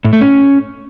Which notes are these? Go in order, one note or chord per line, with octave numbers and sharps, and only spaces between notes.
A2
A3
C#4